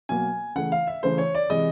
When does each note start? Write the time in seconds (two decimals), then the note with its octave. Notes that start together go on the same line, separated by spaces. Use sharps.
0.09 B2 F#3 A#3 G#5
0.55 C#3 E3 A3 F#5
0.72 F5
0.87 E5
1.03 C#3 E3 A3 C5
1.18 C#5
1.35 D5
1.50 C3 E3 G#3 D#5